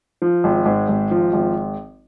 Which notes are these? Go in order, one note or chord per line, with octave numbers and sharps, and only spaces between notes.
F3
G#1
G#2
G#1
F3
G#1